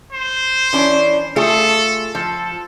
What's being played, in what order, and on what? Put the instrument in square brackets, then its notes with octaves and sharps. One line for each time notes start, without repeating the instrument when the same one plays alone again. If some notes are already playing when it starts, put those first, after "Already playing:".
[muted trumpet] C5
[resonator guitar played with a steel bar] E3 C#4 D4
[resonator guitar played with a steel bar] A3 F4 G#4 [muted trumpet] A4
[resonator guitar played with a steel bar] F3 [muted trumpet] A4